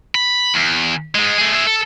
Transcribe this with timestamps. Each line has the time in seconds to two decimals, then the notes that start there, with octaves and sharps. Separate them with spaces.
0.15 B5
0.54 E2
1.15 G#2 G#3
1.38 A3 G#4
1.53 G#4 E5
1.67 A4